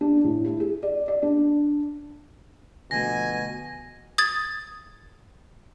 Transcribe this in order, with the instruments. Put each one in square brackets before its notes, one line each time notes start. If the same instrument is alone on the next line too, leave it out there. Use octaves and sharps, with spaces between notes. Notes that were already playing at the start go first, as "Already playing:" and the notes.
[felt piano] D4
A2
E4
G#4
D5
D5
D4
[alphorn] B2 [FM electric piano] D3 F3 A3 [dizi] G#5 [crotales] A#6
[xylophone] D#6 G#6 A6